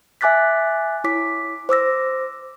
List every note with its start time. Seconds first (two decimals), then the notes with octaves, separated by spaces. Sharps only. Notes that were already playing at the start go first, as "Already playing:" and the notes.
0.21 E5 G#5 D6 F#6 A6 B6
1.04 E4 C#5 D6 B6
1.69 C5 D6 E6 A#6